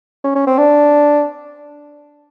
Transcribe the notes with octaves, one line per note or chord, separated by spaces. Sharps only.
C#4
C#4
C4
D4